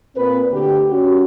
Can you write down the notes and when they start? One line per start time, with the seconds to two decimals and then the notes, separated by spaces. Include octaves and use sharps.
0.16 A#2 C4 B4
0.51 D2 G4
0.91 C#4 F#4